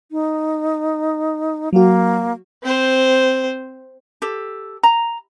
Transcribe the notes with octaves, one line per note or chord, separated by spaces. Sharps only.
D#4
F#3 A#3 F#4
C4 C5
G4 A4
A#5